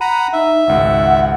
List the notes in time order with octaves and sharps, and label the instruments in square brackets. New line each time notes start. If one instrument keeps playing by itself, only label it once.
[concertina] F#5 A#5 B5 [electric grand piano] D#7
[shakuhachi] D#4 [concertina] E5
[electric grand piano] G#1 C#2 G#2 [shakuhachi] F#5